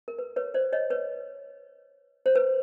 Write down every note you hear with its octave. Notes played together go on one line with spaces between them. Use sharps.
A#4
B4
B4 C#5
C5 D5
C#5 D#5
B4 C#5
C5
B4